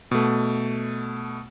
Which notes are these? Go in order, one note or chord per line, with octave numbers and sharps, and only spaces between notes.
B2 A3